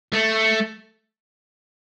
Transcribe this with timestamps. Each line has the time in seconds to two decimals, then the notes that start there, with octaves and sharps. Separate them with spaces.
0.13 A3